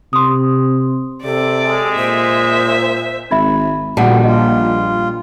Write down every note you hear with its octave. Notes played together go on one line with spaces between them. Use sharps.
C3 C6 D#6
C3 A4 D5
G#3
A#2 C5 E5
G#1 E5 B5 G#6
A#1 A#2 D3 D#3 G3 F#4 F#5 A5
F4 D#5